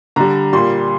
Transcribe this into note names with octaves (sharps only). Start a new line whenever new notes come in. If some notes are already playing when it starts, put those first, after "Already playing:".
D3 G3 A#5
A#2 G3 C6